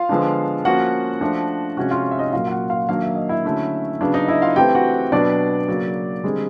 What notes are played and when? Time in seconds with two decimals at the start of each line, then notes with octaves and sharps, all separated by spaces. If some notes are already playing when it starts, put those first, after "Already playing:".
Already playing: F4 F5
0.09 D3 F3 G#3 B3 D4
0.65 F3 A#3 C#4 F#4 F#5
1.21 F3 A3 D4
1.77 C3 F3 G#3 C#4 F#4 F#5
1.91 F4 F5
2.11 E5
2.19 D#4 D#5
2.33 A#2 F#3 A#3 F4 F5
2.47 F5
2.51 F#4 F#5
2.70 F4 F5
2.89 D#3 F#3 A#3 D4 F5
3.02 E5
3.16 D#5
3.29 E4 E5
3.45 D3 F#3 A3 C#4
4.00 C#3 F#3 B3 D4
4.14 D#4 D#5
4.28 E4 E5
4.42 F4 F5
4.56 E3 A3 C4 G4 G5
4.75 F#4 F#5
5.12 B2 F#3 B3 D4 D5
5.68 C#3 F#3 A#3
6.24 D3 G3 G#3 C4 G#4